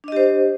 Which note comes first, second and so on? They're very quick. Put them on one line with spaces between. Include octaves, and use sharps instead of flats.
D4 D#5 G4 C5